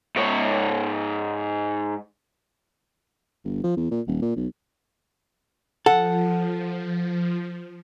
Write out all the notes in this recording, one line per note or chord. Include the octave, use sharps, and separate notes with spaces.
G#2 C#5
G1
F3
E2
A#2
D#1
A#2
B1
F3 A4 F#5